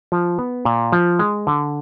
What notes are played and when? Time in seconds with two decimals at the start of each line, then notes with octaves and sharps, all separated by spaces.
0.12 F3
0.39 B3
0.65 A#2
0.92 F3
1.19 G#3
1.47 D3